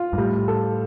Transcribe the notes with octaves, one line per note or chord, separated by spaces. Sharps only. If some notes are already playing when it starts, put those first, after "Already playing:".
Already playing: F4
G2
A2 G3
A4